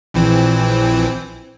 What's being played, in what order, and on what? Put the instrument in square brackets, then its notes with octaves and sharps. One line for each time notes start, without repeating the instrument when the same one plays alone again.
[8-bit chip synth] A#1 E3 C4